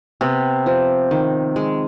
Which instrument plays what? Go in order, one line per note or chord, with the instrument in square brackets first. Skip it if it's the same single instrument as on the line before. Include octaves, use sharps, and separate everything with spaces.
[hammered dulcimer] C3 [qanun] B3
[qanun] F3
D#3
G#3